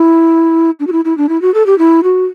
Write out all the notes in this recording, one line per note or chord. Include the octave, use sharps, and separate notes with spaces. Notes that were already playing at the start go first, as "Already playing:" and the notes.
Already playing: E4
D4
F#4
E4
E4
D4
E4
F#4
A4
G4
E4
F#4